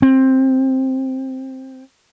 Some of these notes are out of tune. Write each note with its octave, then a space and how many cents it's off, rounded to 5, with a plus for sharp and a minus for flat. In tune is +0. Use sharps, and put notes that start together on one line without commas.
C4 +10